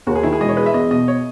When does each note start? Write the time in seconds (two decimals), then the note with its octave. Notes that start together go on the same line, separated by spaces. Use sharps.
0.07 D#2 F#4
0.15 G#4
0.23 D#3 E4
0.33 G#4
0.40 E1 D#5
0.48 C#5
0.57 G#3 B4
0.66 E5
0.74 E2 D#5
0.91 B2 D#5
1.08 C#5